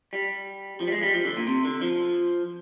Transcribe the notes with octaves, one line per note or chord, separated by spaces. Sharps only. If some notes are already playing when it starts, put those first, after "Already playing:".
G3
F3
G3
G#3
G3
F3
D3
A#2
C3
D3
F3